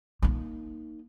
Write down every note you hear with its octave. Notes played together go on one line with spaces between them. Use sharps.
A#3 D#4